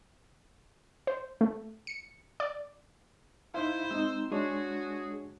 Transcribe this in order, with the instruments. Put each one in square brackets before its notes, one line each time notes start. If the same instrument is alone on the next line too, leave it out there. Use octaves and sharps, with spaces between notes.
[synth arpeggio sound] C5
A3
C#7
D5
[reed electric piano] D#4 E5 F5 [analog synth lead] E4 [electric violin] C5
[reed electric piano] G#3 C4 D#4 [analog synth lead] E6
[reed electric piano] G#3 D4 C#5 [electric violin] F#4 [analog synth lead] G#4